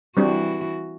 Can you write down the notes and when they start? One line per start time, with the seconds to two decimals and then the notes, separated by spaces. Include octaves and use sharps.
0.17 E3 G3 C4 D4 F#4